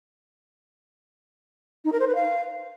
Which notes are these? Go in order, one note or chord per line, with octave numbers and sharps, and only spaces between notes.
D#4
A#4
C5
B4
F5